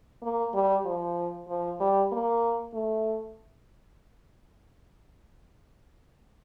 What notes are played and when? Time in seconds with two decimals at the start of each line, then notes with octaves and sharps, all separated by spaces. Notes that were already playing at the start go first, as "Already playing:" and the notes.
0.23 A#3
0.54 G3
0.85 F3
1.48 F3
1.80 G3
2.12 A#3
2.74 A3